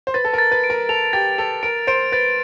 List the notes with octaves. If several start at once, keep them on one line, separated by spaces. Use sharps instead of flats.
C5
B4 A6
A4
A#4 A6
B4
D7
A#4
A4 F7
G4 A6
A4 F7
A#4 D7
C5 D7
B4 A6